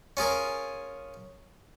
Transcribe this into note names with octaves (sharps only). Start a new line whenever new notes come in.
C#4 F4 G#4 A#4